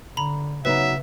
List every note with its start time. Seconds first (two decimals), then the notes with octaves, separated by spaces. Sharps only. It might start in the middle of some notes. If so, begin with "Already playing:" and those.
0.17 D3 A#5 B5
0.65 C#3 F#3 B3 D#4 B4 E5